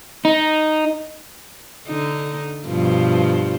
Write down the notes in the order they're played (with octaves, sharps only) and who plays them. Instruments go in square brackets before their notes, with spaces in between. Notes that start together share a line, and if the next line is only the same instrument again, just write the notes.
[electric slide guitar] D#4
[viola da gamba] D3 D#4
G2 B2 F3